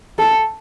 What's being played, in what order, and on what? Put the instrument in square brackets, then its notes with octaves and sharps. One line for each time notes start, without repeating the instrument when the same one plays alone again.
[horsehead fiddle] A4